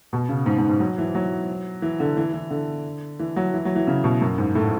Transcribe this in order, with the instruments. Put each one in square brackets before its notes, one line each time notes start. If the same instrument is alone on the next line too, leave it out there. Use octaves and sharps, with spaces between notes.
[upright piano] B2
C#3
G#2
G#2
G#2
F#3
E3
F#3
E3
D3
E3
E3
D3
E3
F#3
E3
F#3
E3
C#3
B2
F#2
G#2
A2